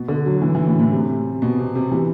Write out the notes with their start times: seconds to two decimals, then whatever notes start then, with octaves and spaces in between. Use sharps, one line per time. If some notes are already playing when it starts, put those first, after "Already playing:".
Already playing: B2
0.08 D3
0.26 F#3
0.42 E3
0.55 E3
0.67 A2
0.79 A2
0.92 C3
1.42 B2
1.59 C3
1.75 C3
1.92 E3